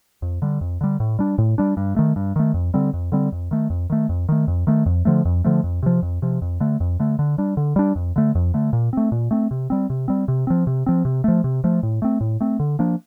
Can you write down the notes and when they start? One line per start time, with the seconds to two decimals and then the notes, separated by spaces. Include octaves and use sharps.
0.22 F2
0.42 D3 G3
0.61 F2
0.81 D3 G3
1.00 A2
1.19 G3 D4
1.38 A2
1.58 G3 D4
1.77 G2
1.96 D#3 A3
2.16 G2
2.36 D#3 A3
2.54 F2
2.74 D3 G3 C4
2.94 F2
3.12 D3 G3 C4
3.32 F2
3.51 D#3 A3
3.70 F2
3.90 D#3 A3
4.09 F2
4.29 D#3 A3
4.48 F2
4.67 D#3 A3
4.86 F2
5.05 D3 F3 A3
5.25 F2
5.44 D3 F3 A3
5.64 F2
5.83 C3 F3
6.02 F2
6.22 C3 F3
6.42 F2
6.60 D3 A3
6.80 F2
7.00 D3 A3
7.19 D3
7.38 G3 D4
7.57 D3
7.76 G3 D4
7.96 F2
8.16 D3 A3
8.35 F2
8.54 D3 A3
8.73 A#2
8.93 A3 C4
9.12 A#2
9.31 A3 C4
9.51 C3
9.70 G3 C4
9.90 C3
10.08 G3 C4
10.28 C3
10.47 F3 C4
10.67 C3
10.86 F3 C4
11.05 C3
11.24 F3 A3
11.44 C3
11.64 F3 A3
11.83 A2
12.02 A3 C4
12.21 A2
12.41 A3 C4
12.60 D3
12.79 F3 A#3 D4